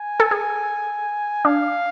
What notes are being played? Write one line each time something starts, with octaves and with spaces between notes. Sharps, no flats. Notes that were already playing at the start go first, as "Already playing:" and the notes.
Already playing: G#5
A4
G#4
D4 F5